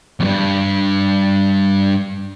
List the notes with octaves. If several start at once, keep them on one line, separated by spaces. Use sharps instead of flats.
E2 G2